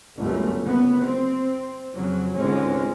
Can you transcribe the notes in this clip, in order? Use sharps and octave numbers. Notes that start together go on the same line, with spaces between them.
G1 C#2 F#2 A3
F#1 B3
C4
F2 C#3 F#3
G#1 C#2 D3 G#3 C4 C#4